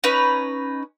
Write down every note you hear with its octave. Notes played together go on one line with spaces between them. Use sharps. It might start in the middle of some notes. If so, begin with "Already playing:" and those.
C#4 D#4 B4